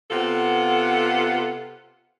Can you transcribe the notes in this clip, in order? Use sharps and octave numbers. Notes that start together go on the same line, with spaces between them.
C3 B3 F4 A4 F#5